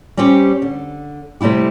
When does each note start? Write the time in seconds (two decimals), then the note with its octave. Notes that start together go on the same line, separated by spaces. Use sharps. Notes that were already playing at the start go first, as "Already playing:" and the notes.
0.17 G3 C4 C#4 G4
0.62 D3
1.41 C3 G3 A3 E4 G4